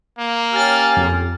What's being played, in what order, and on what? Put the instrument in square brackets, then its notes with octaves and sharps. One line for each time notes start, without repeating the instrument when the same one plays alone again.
[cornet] A#3
[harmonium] C#4 G4 [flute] G#5 [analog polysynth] F6 A6
[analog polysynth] F2